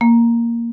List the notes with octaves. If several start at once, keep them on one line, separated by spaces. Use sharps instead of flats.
A#3